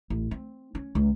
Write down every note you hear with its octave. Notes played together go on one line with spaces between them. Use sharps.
A1
C4
C#4
C#2